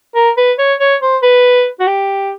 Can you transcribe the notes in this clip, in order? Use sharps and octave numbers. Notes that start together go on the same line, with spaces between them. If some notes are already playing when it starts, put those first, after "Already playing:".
A#4
B4
C#5
C#5
C5
B4
F#4
G4